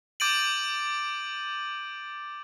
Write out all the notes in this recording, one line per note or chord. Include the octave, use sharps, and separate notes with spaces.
D6 G6 A6 D7 D#7 F#7